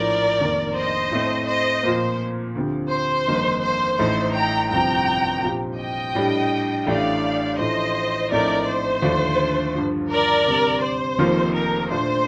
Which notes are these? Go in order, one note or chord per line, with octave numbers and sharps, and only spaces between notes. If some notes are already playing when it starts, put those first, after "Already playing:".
Already playing: A#1 A2 F3 A#4 D5
F1 F2 D#3 A#3
C5 D#5
A2 A3 C4
C5 D#5
A#2 F3 A#3 C5
D2 D3 F3 C4 G4
C5
G1 F2 D#3 A#3 D#4
C5
A1 A2 A3 D#4 C5
G5 A#5
G1 F2 C3 F3 G5 A#5
A#2 F3 C4 G4
D#5 G5
A2 G3 D4 G4
A1 A2 A3 D4 G4 D5 F5
A1 A2 F3 A3 C5 D#5
A#1 A2 A3 C4 D#4 A#4 D5
C5
D#2 D3 F3 A3 D4
G2 D3 F3
A#4 D5
D2 C3 G3 C4
C5
F1 F2 D#3 A#3 F4
A#4
A#2 A3 D4 C5